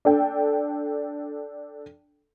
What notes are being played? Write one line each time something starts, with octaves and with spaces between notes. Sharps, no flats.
D4 A4 G5